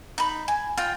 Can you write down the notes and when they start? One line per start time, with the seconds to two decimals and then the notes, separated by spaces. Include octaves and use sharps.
0.18 D#4 B5
0.48 G#5
0.77 F4 G5